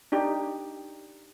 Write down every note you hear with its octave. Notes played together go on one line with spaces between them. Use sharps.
D4 D#4 G4